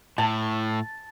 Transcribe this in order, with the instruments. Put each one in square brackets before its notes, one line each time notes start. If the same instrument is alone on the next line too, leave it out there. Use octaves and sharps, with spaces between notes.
[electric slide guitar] A2 [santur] A5